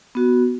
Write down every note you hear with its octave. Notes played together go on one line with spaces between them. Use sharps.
B3 F#4